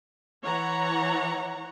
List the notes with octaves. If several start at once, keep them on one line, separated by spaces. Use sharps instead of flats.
E3 C#5 F#5 A#5